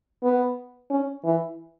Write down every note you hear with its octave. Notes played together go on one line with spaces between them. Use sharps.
B3
C#4
E3